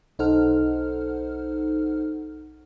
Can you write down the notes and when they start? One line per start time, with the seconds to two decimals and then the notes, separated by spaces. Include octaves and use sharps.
0.19 B1 D#4 A4 C5 F#5 F6